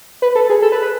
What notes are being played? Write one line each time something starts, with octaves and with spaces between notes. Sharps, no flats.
B4
A4
G#4
A4
B4
B4